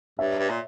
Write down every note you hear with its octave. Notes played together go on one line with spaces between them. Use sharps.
G2 C#5 E5
G2
A#2